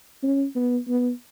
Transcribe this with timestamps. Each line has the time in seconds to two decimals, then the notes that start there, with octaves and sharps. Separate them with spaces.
0.23 C#4
0.55 B3
0.88 B3